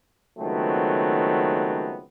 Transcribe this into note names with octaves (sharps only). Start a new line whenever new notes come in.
C#2 D#3 F#3 A3 B3 C4